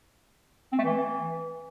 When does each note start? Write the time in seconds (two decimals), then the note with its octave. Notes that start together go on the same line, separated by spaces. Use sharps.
0.73 C4
0.79 A3
0.85 E3